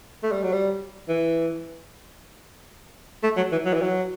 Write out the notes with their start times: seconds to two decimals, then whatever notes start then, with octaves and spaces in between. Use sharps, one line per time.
0.23 A3
0.32 G3
0.43 F#3
0.53 G3
1.09 E3
3.23 A3
3.37 F#3
3.52 E3
3.65 F#3
3.74 E3
3.82 F#3